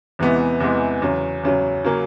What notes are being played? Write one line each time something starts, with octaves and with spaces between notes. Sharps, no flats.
E2 C3 E3 G#3 B3
E2 C3 E3 G#3 B3
E2 C#3 F#3
E2 C#3 F#3
C#3 F#3 A#3 C#4